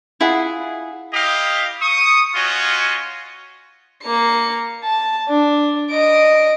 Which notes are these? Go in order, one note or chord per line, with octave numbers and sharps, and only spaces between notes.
E4 F4 G#4 F#5
E4 G4 D#5 F5
C#6 D#6
C#4 F4 F#4 C#5 D#5
A#3 C#7
A5
D4
D#5 D7